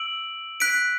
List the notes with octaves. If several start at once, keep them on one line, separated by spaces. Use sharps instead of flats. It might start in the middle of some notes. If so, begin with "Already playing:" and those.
Already playing: E6 D7 F#7
F#6 B6 D7